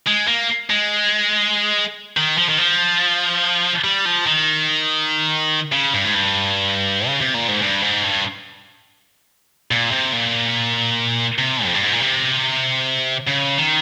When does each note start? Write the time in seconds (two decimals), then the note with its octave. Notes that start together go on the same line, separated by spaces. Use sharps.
0.07 G#3
0.28 A#3
0.70 G#3
2.17 D#3
2.38 F3
2.49 D#3
2.58 F3
3.84 G3
4.05 F3
4.26 D#3
5.73 C#3
5.94 G2
6.05 G#2
6.15 G2
7.07 C#3
7.21 C3
7.34 A#2
7.48 G#2
7.61 G2
7.82 G#2
8.03 G2
9.71 A#2
9.91 C3
10.13 A#2
11.38 C3
11.65 F2
11.74 G2
11.84 G#2
11.92 A#2
12.01 C3
13.27 C#3
13.58 D#3